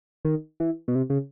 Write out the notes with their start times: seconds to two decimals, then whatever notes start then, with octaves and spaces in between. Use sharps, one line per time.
0.25 D#3
0.60 E3
0.88 B2
0.95 C3
1.10 C#3